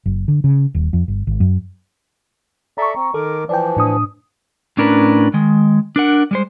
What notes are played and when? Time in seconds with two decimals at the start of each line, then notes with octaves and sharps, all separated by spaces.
0.06 F#1
0.28 D3
0.44 C#3
0.74 D#1
0.93 F2
1.08 G1
1.27 G#1
1.40 F#2
2.78 A4 D5 E5 A#5 C#6
2.95 C4
3.14 D#3 A4 A#4 D6
3.49 E3 F3 D5 G5
3.77 A2 D4 D#6
4.77 A2 C#4 D4 A#4 B4
5.34 D#3 G#3
5.96 D4 A#4 F#5
6.31 G3 G#3 C5